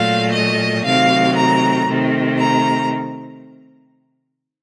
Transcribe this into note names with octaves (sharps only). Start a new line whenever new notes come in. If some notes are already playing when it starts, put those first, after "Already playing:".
Already playing: A#2 F#3 A3 F5
D#5
C3 D#3 F#3 A3 F5
A#5
C3 D#3 A3
A#5